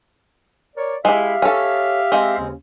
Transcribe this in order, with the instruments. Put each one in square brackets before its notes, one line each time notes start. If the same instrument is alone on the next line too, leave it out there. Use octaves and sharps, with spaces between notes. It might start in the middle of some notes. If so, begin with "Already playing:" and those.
[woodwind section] A#4 C#5 D5
[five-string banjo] G#3 E4 [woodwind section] G4 E5 F5
[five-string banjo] C#4 A4
G#3 C4
[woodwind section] D#2 C#3 C#4